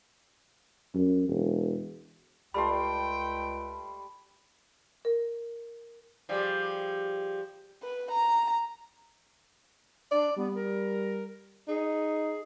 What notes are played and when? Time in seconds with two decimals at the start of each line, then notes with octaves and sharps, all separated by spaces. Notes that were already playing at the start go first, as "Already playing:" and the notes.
0.95 F#2
1.29 E1
2.54 C#2 G3 A3 G5 B5 C6
5.05 A#4
6.29 F3 G3 G#4
7.83 B4
8.11 A#5
10.12 D4 D5
10.36 G3 B3
10.54 A#4
11.68 D#4 G#4